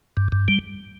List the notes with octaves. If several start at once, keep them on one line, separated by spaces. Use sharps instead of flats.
G2
G2
G3